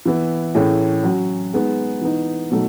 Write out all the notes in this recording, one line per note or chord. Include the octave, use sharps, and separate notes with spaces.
E3 B3 E4
A2 E3 A3 C#4 G#4
F#3 C#4 F#4
G#3 B3 D#4
E3 B3 D#4
B2 F#3 A3 D#4